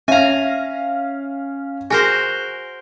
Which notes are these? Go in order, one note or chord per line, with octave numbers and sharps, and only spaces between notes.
C#4 E5 F5 G#5 A#5
F#4 G#4 A#4 C5 G#5